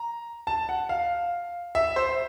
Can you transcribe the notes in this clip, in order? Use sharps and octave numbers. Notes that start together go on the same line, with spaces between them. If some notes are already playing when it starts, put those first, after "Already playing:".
Already playing: A#5
A5
F#5
F5
E5
C5